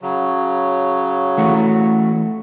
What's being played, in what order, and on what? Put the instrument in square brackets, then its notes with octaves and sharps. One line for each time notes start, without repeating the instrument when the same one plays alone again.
[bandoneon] C#3 F#3
[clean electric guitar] E3 A3 F#4